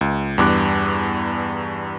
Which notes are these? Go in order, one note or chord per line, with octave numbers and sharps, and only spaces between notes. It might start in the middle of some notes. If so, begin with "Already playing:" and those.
C#2
E2 G2 D6 F#6